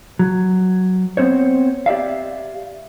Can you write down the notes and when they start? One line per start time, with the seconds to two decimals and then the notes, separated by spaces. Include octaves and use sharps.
0.19 F#3
1.17 B3 C4 C5 C#5
1.86 G4 D5 E5 F5